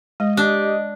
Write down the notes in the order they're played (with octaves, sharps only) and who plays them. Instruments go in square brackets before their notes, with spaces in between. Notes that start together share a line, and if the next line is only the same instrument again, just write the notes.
[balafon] G#3 [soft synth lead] D#5
[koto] D4 [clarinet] G4